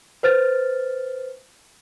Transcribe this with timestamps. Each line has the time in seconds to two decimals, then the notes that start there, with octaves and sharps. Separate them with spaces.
0.23 B4 C5 F6 A6